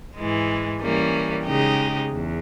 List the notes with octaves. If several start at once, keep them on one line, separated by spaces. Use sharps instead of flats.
G#2 E3 G#3
E3 G3 A#3 C#4
C#3 G#3 D#4 G4
E2